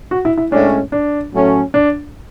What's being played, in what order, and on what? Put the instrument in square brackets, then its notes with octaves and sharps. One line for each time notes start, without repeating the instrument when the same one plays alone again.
[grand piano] F#4
E4
E4
[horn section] A2 G#3 C#4 [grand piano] D4
[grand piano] D4
[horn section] A2 F#3 A3 C#4
[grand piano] D4